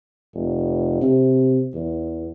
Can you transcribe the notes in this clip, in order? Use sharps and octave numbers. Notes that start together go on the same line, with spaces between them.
F1
C3
E2